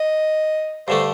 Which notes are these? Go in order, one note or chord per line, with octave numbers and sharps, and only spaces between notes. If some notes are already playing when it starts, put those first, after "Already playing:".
Already playing: D#5
G2 D3 A3 C5